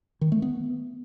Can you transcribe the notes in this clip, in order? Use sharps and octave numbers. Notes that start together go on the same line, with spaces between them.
D#3
A3
B3